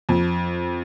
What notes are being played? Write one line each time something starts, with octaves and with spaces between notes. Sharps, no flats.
F2